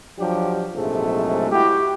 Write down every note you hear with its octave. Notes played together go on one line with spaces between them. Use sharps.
F3 F#3 D4 G4
A#1 G#2 C3 F#3 G#3 A3
E4 F#4 G4